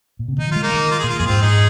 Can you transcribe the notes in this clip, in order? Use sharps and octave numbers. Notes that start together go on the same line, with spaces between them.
A#2
C3
D#3 D#4
F3
G#3 F4
A#3 D#4
D#3
F4
G#4
A#2
F4
F2 G#4
G#2 C4 F4
D#4 G#4